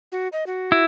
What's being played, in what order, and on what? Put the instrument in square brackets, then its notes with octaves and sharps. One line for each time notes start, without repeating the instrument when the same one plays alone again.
[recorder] F#4
D#5
F#4
[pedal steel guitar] E4